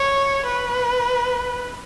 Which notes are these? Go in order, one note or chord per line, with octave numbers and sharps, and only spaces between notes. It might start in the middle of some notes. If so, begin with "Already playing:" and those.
Already playing: C#5
B4